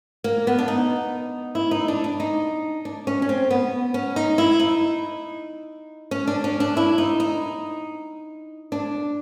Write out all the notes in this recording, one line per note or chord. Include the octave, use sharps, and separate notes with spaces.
A#3
B3
D4
D#4
E4
D#4
D4
D4
D#4
D4
C#4
C#4
C4
B3
C#4
D#4
E4
D#4
C#4
D4
C#4
D4
E4
D#4
D#4
D4